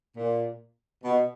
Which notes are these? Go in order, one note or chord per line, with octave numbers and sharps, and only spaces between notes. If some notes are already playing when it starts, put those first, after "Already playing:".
A#2
B2